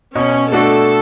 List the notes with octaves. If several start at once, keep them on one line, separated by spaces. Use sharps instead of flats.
B2 C#4
A3 D4 F#4 A4